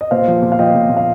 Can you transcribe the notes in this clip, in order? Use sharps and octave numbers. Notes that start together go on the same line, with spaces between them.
D#5
A#2 C5 F5
F3
A#2
F5
F3 D#5 G5
A#2
A#2
F5